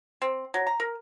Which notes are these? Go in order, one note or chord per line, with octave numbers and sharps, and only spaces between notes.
C4
F#3
A#5
A#4